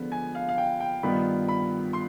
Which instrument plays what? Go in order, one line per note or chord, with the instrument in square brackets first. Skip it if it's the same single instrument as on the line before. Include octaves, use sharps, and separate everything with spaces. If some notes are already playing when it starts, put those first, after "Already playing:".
Already playing: [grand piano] D3 F3 G#3 B3
G#5
F5
F5
G5
G5
G2 D#3 B3 F4 B5
B5
C6